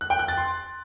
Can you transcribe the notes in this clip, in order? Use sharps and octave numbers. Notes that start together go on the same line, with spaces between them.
F#6
G5
F#6
A6
C6